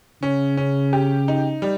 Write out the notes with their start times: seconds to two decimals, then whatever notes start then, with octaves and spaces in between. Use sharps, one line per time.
0.22 C#3 C#4
0.57 C#4
0.93 G4
1.28 D#4
1.62 G3